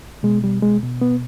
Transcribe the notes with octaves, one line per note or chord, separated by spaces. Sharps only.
B2 G#3
G3
G#3
B2
B3